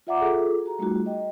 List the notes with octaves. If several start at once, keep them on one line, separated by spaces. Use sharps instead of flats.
F4 D5 E5 F#5 A#5 D6
F4 G#4 A4
F#4 A#5
G3 A3 D#4 F4 F#4
D#5 G5